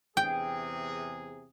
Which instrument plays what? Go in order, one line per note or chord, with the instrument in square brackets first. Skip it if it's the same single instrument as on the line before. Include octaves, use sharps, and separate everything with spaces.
[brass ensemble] E2 C3 G#4 [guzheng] G5